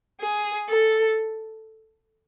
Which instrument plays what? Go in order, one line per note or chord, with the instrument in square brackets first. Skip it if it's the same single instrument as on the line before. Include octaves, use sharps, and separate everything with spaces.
[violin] G#4
A4